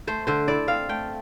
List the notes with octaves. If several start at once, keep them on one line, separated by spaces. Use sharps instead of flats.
A3 C5
D3 C5
E4 D5
C4 F5
A3 G5